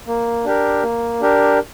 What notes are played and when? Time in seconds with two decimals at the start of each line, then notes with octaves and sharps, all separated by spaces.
0.07 A#3
0.45 D4 G4 A#4
0.83 A#3
1.21 D4 G4 A#4